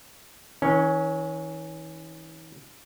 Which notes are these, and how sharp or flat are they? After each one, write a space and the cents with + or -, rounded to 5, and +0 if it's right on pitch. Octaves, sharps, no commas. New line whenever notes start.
E3 -45 C#4 +0